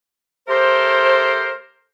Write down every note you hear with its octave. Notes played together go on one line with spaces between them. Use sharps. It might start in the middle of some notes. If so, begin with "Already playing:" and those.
A3 G4 A4 A#4 C5